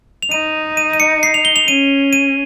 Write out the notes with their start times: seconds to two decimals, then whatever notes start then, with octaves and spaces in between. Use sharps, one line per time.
0.22 F7
0.32 D#4 D#7
0.77 D#7
0.93 D#7
1.00 C#7
1.23 C7
1.34 F7
1.45 G7
1.56 F7
1.68 C#4 D#7
2.13 D#7